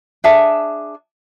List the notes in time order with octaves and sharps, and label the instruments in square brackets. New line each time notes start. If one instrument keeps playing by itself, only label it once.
[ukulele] D4 G#4 E5 A5